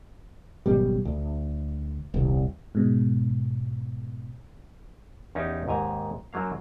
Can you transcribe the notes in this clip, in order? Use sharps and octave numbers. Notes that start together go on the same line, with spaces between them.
G#1 F#2 B2 G3
D2
D#1 C2
G#2 B2
E2 C#4 D#4 G4
D#2 G#2 G#5 A#5
F#2 F#3 A#3 F5